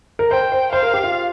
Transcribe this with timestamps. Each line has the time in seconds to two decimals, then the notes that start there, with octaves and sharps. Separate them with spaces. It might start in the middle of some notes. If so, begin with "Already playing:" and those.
0.19 A#4
0.31 C5 G5
0.52 C5
0.73 C5 F5
0.83 A#4
0.94 G4
1.03 F4